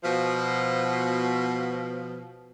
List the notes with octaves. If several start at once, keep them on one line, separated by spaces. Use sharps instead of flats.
B2 F3